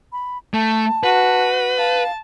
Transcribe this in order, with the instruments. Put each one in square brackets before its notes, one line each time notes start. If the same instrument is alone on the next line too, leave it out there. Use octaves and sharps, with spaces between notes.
[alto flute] B5
[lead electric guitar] A3 [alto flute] A5
[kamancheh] F#4 [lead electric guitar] B4
[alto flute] F5 [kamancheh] A5